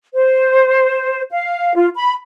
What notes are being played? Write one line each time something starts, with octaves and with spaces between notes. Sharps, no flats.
C5
F5
F4
B5